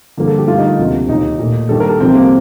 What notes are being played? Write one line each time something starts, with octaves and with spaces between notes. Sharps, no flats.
G2 D3 F3 A#3
A4
G4
G2 D3 A3 F4
D#4
D2 C3 F3 A#3
D#2 D#3 A#3 D#4
A#2 A3
G2 D#3 G3 A#3 A4
A#4
A4
C2 C3 F3 C4
A#3